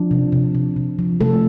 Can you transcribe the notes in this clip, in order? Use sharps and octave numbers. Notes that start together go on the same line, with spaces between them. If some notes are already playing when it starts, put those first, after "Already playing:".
Already playing: F3 D4
C3
C3
C3
C3
F3
C3 A3 A4